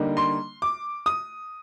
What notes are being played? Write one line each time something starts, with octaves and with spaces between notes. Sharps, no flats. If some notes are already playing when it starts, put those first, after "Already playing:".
Already playing: D3 G3 A#3 D#4
C6
D6
D#6